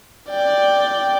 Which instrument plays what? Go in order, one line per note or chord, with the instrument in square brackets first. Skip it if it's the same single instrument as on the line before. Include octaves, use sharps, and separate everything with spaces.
[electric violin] D5 G5